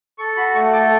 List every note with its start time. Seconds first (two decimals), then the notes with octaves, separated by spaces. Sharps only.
0.18 A4 C#6
0.37 F#4 B5
0.55 A3 C#6
0.72 A4 D6